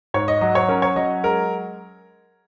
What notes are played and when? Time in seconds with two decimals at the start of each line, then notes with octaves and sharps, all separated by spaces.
0.14 G#2 C#5
0.28 D#5
0.41 F#3 D#5
0.55 C#5
0.69 C#4 A#4
0.82 C#5
0.96 F#3 D#5
1.23 G#3 A#4